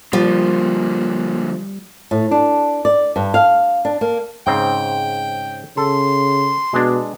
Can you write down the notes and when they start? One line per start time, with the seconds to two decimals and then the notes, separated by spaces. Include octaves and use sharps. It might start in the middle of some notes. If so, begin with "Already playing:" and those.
0.13 D3 F3 G3 A#3
2.11 A2
2.31 D4
2.85 D5
3.16 G2
3.34 F5
3.85 D4
4.01 A#3
4.47 G#2 C#3 C4 G5
5.77 C#3 A4 C6
6.73 B2 G#3 D4